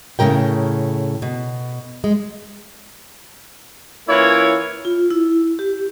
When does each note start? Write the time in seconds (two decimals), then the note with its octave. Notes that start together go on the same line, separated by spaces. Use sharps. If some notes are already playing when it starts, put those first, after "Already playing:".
0.19 A2 C#3 F3 A#4 G5
1.22 B2
2.04 G#3
4.08 E3 A#3 C#4 E4 F4 C#5
4.85 F4
5.10 E4
5.59 G4